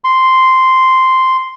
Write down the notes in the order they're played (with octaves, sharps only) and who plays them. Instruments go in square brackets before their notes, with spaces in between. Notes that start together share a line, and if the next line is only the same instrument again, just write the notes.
[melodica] C6